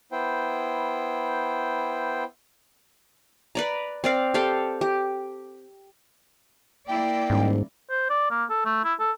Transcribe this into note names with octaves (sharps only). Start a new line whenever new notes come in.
B3 E4 C5 G5
B4 D5 A#5
C4 D5 F5
G4 A4 F5 G5
G4
A#3 E4 D5 G5
D#1 G#2
C5
D5
A#3
A4
A3
E4
A4